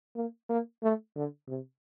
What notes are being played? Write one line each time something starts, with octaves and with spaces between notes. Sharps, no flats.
A#3
A#3
A3
D3
C3